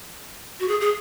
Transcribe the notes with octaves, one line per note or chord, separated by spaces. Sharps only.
F#4
G#4
G#4